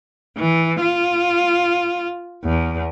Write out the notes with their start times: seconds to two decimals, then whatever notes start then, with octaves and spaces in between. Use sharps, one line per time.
0.37 E3
0.80 F4
2.44 E2